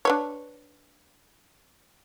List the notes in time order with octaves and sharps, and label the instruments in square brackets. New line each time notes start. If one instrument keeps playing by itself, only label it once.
[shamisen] D4 B4 C#5